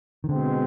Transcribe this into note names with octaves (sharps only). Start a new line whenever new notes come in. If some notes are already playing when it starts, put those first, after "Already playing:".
D#3
B2 D3 G#3 C4